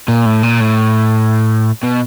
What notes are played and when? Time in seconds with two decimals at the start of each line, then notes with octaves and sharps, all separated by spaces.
0.08 A#2
0.26 A2
0.43 A#2
0.60 A2
1.83 B2